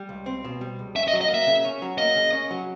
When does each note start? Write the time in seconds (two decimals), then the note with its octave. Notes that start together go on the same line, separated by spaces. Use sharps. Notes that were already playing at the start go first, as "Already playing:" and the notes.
Already playing: G3
0.09 C#2
0.26 C4
0.44 B2
0.61 G3
0.79 C#2
0.95 C#4 E5
1.08 D#5
1.13 F#3
1.21 D#5
1.30 A#3 E5
1.47 C#3
1.65 C#4
1.82 F#3
1.98 A#3 D#5
2.16 C#3
2.32 C#4
2.51 F#3